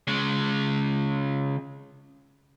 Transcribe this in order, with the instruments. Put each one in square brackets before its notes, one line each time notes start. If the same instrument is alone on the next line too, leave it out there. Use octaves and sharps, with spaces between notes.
[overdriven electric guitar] C#3 G#3